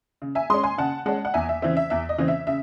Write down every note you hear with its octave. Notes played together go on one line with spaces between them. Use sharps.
C#3
E5 G#5
G#3 C#4 C6 D#6
G#5 C6
C#3 F#5 A5
G#3 C#4 F#5 A5
F#5
E2 E5 G#5
E5
C#3 E3 C4 E5
E5
E2 E5
D#5
C#3 E3 C4
E5
C#3 E5